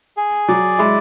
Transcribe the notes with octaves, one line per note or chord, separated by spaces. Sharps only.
G#4
F#3 D5
G#3 E4